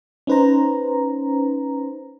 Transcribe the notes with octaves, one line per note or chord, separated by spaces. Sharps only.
C#4 D#4 B4 C5 A#5